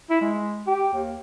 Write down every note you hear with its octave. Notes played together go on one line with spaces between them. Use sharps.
E4
G#3
G4
D#2